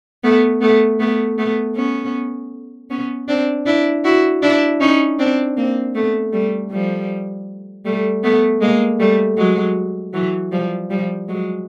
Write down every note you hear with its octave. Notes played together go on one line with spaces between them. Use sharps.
A3 B3
A3 B3
A3 B3
A3 B3
B3 C#4
B3 C#4
C4 D4
D4 E4
E4 F#4
D4 E4
C#4 D#4
C4 D4
A#3 C4
A3 B3
G3 A3
F3 G3
G3 A3
A3 B3
G#3 A#3
G3 A3
F#3 G#3
E3 F#3
F3 G3
F3 G3
F#3 G#3